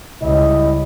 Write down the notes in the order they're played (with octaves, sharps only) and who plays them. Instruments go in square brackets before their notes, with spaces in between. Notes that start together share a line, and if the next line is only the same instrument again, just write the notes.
[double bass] C#2 [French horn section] G3 E4 D#5